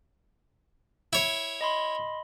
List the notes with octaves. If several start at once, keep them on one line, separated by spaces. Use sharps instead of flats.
E4 C#5
D#5 B5 C6